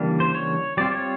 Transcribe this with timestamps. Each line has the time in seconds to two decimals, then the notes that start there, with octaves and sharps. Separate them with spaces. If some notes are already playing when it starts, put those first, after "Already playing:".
Already playing: C#3 E3 G3 A#3 D4
0.20 C5
0.35 C#5
0.77 G3 C4 F4 D5
0.92 C#5